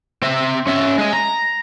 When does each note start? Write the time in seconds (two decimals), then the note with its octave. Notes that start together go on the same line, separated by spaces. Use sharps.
0.22 C4 E5
0.67 C#4 E5
0.98 G#3 D#5
1.13 A#5